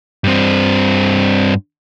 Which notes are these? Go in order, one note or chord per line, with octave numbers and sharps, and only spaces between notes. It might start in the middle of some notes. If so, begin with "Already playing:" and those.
G2 C4